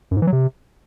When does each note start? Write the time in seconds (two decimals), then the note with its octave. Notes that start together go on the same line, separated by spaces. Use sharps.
0.11 F#2
0.17 G#2
0.22 E3
0.27 F#3
0.33 C3